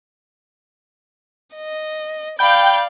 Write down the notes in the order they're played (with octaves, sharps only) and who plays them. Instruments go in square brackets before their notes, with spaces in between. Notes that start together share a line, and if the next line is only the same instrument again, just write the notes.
[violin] D#5
[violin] D5 F5 [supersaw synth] G5 G6 [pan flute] B5